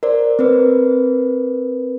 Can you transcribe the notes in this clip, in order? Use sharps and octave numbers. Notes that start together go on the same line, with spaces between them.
A#4 C5 D5
C4 A#4 B4